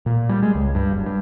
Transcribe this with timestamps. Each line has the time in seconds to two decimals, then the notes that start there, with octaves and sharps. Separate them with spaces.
0.06 A#2
0.29 G3
0.43 G#3
0.55 C#2
0.75 G2
0.92 F#1
1.06 G2